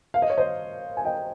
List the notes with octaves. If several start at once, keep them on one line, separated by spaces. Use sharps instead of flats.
F5
D#5
C#5
C5 D#5
G#5
D#5 G5